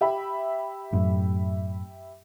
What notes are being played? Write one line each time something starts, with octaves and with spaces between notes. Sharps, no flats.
G4 E5 B5
F#2 A2